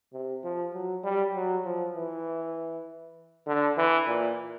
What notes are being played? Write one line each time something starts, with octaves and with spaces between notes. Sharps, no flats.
C3
F3
F#3
G3
F#3
F3
E3
D3
E3
A#2